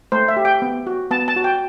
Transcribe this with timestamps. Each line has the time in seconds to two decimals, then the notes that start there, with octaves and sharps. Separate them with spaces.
0.12 A3 C5
0.28 E5
0.37 G4
0.45 G5
0.62 B3
0.87 F#4
1.11 B3 A5
1.28 A5
1.36 F#4
1.44 G5